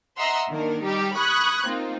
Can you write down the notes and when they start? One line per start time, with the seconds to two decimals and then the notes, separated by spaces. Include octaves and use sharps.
0.17 D#5 E5 F#5 A#5 C6 E6
0.50 D#3 A#3 D4 A#4
0.82 G3 D#4 G4
1.15 B5 C#6 D#6 F#6 G#6
1.66 A#3 C4 D#4 F4